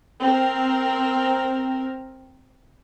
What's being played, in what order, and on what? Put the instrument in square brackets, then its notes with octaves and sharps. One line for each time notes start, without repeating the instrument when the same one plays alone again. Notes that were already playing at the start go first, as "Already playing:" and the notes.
[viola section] C4 A#4